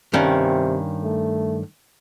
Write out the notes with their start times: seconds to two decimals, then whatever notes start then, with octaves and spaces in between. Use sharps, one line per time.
0.14 G2 C3 D#3 C#4
1.03 A3